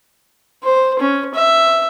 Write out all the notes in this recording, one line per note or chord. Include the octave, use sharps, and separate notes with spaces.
C5
C#4
E5